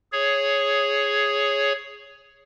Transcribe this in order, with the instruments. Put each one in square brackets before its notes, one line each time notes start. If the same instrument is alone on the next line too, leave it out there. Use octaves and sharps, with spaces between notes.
[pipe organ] G#4 C#5